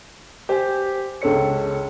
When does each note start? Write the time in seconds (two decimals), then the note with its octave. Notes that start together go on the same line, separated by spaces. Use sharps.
0.49 G4 C5 G#5
1.22 C#2 A4 C#5 C#7